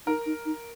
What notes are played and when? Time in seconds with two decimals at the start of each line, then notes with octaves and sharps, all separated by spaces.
0.06 D#4 A#4
0.26 D#4
0.45 D#4